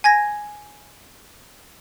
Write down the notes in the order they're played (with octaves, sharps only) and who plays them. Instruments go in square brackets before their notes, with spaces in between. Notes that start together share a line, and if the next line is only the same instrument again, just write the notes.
[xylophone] G#5 G#6 A#6